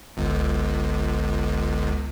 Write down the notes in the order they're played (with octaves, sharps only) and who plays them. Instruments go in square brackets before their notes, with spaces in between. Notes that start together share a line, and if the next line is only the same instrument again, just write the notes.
[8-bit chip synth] G1 C#2